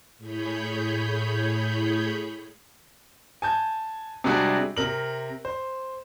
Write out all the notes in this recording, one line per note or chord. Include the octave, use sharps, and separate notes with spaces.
A2 G#4 C#5 B5 G6
G#5 A5 G6
C3 G3 G#3 D4 F#4 G#4
C3 A#4 F#7
C5